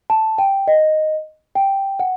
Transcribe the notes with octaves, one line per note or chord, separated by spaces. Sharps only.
A5
G5
D#5
G5
F#5